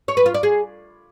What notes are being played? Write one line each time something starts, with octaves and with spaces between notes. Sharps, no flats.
C#5
B4
F4
D5
G#4